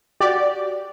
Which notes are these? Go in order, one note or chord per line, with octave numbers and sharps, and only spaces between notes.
F#4 G4 D5